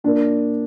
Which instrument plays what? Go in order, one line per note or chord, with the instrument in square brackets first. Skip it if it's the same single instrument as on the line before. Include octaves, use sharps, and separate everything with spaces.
[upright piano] A#2 A#3 D4